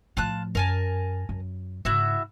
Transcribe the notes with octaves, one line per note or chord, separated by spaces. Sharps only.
A2 F3 F4 A5 F#6
F#2 A#4 G#5 A5
F#2
G#2 C#3 E4 F#4 E5